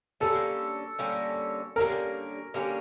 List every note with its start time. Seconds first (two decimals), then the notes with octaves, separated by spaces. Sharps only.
0.20 D3 G3 A#3 C#4 A4
0.99 D3 G3 A#3 C#4
1.76 D3 G3 A#3 C#4 A#4
2.54 D3 G3 A#3 C#4